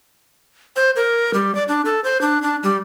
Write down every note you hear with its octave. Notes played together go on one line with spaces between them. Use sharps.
C5
A#4
G3
D5
D4
A4
C5
D4
D4
G3